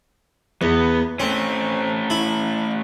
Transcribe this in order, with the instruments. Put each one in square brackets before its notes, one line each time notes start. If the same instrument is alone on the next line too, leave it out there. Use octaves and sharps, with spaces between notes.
[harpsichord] E2 [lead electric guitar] B3
[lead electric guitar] A3 C#4 [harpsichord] C4
[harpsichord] E4